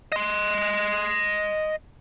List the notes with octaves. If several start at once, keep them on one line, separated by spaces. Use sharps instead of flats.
D#5 C6